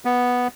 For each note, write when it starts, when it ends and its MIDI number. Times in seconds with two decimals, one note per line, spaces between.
0.05 0.48 59